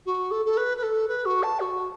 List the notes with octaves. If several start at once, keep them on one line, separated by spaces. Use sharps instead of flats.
F#4
A4
A4
B4
B4
A4
B4
F#4
A5
F#4